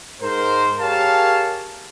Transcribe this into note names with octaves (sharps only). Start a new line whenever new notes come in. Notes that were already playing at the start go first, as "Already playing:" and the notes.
G#2 A#4 C5
G4 G#4 A#4 C#5 F5 A5